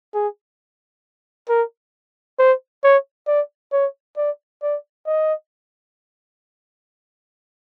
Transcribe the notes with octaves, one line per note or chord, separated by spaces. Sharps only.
G#4
A#4
C5
C#5
D5
C#5
D5
D5
D#5